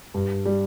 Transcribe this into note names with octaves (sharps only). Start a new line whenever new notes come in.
G2
G3